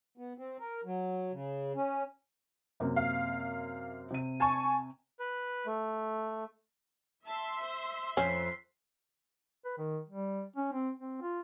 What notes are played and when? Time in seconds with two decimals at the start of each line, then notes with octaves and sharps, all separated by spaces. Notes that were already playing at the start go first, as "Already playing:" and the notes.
0.17 B3
0.38 C4
0.60 A#4
0.85 F#3
1.32 C#3
1.75 C#4
2.80 F#2 C3 A#3
2.96 F5
4.10 C3 D#7
4.40 G#5 A5 C#6
5.19 B4
5.66 A3
7.26 E5 A5 C6
7.61 C5
8.17 F2 C#4 C5 B6 C7
9.65 B4
9.78 D#3
10.09 G3
10.56 C#4
10.73 C4
10.99 C4
11.21 F4